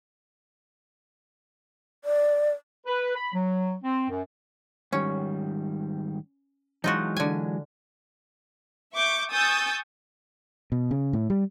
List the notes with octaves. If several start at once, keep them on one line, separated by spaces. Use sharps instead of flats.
D5
B4
B5
F#3
C4
F#2
G#2 D#3 G3 C#4
E3 F#3 G#3 D#4 F4 F#4
D3 G#5
E5 C#6 D6 G6
G#5 C#6 D#6 E6 G6 A6
B2
C#3
A2
G3